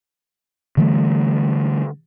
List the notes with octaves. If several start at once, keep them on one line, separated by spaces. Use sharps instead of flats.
D3 E3 G3 A3